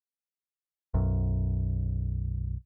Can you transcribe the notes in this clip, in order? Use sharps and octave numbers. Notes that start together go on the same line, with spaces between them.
B1 F#2